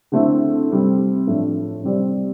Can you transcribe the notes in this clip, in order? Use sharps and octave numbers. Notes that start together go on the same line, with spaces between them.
D3 A3 C4 E4
C3 G3 C4
A2 F3 A3 D4
C3 G3 C4 G4 D5